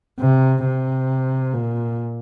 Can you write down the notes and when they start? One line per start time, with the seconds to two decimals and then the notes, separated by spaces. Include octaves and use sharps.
0.20 C3
0.65 C3
1.53 A#2